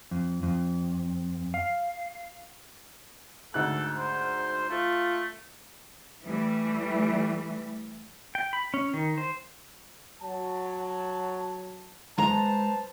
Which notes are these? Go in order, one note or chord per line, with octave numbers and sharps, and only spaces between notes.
F2
F2
F5
D2 G#2 A4 F#6
C5
A3 F4
E3 G3 A3
G5
B5
C#4
D#3
C5
F#3 A5
G#3 B4 C5 A5 A#5